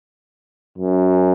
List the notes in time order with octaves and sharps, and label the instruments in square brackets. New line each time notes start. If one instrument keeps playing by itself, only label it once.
[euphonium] F#2